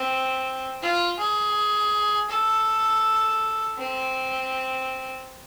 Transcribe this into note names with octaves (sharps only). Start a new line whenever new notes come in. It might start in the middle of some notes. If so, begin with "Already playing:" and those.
Already playing: C4
F4
G#4
A4
C4